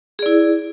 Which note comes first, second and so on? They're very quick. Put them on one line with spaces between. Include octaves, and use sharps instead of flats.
G#4 D5 E4